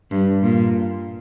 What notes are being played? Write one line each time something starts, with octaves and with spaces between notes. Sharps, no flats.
G2
A#2